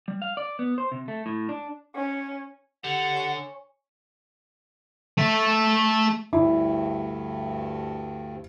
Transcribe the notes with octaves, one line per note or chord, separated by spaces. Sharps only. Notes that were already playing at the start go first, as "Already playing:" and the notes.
G3
F5
D5
B3
C5
C3
A3
A2
D4
C#4
D3 G4 F#5
C#5 G#5 C#6
A3 E5
D2 G2 E4